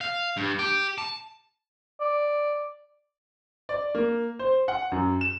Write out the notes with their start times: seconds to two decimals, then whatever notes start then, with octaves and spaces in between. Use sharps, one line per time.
0.01 F5
0.37 G2
0.59 G4
0.98 A5
2.01 D5
3.69 D5
3.95 A#3
4.39 C5
4.68 F#5
4.92 F#2
5.21 E7